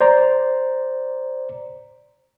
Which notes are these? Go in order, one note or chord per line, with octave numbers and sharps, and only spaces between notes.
C5 D5 A#5